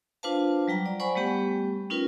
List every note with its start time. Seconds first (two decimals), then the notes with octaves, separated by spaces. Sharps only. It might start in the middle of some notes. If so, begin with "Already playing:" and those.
0.23 D4 F4 B4 C5 F5 A5
0.68 F#3 G3 G5 A#5
0.86 D5
1.00 C5 D5 F#5 G#5 B5 C#6
1.16 G3 A3 B3 G4 G5
1.90 C#4 D#4 F4 A#4 B4